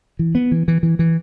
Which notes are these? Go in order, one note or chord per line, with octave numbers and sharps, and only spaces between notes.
E3
B3
E3
E3
E3
E3